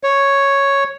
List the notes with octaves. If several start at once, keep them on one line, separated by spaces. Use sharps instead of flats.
C#5